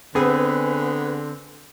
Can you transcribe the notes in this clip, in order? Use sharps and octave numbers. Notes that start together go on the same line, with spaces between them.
D3 B3 C4 G#4 B4